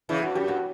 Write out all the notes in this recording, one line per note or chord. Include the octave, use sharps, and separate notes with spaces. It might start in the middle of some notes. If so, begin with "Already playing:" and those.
C#3 E3 E4
G2 F#4
F#2 G4
G2 F#4